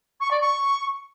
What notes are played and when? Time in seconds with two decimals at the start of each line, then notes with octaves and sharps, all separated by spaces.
0.20 C#6
0.30 D5
0.41 C#6